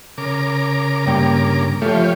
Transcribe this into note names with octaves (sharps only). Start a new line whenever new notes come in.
C#3 A#4 D6
G2 A#3 G5
F3 A3 F4 G4 C#5